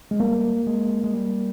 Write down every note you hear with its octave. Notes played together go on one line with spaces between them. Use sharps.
G#3
G3 A#3
G#3
G#3
G3